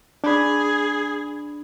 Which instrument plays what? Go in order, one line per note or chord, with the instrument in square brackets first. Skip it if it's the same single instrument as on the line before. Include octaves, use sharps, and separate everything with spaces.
[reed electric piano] D4 B5 [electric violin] G#4